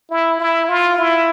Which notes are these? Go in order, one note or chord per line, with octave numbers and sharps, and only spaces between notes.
E4
E4
F4
E4